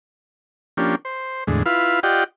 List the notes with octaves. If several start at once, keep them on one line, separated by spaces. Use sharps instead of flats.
F3 A#3 C#4 D4 G4
C5
E2 A2 D3 G#3
E4 F4 B4 F5
F4 G4 D5 D#5 F#5 G5